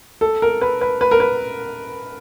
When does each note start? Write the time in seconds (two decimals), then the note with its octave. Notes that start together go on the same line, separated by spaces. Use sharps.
0.21 A4
0.42 A#4
0.61 B4
0.81 B4
1.01 B4
1.11 A#4
1.20 B4